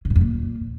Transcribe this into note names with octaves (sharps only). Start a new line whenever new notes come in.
C#3
A2
F2
A#2